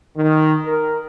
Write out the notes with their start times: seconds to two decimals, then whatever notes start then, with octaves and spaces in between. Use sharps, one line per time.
0.17 D#3
0.65 A#4